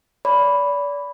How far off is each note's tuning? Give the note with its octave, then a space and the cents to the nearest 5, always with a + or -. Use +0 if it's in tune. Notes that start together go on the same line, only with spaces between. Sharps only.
D5 -35 B5 +0